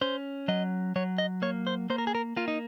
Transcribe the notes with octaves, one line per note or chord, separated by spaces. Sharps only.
C#4 C5
F#3 D#5
F#3 C#5
D#5
A#3 C#5
C5
A#3 C5
A#4
G#4
A#4
A#3 F4
D#4